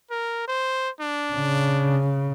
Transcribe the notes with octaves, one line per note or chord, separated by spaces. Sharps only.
A#4
C5
D4
C#3